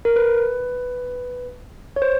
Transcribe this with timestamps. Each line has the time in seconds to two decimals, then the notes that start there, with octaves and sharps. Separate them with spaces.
0.05 A#4
0.16 B4
1.96 C#5
2.02 C5